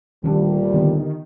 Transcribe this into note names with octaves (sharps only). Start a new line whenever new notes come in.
D2 A#2 D#3 G3 C#4 D4
D3 D#3 B3